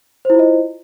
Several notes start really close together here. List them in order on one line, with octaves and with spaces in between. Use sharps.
C5 E4 F4 D#5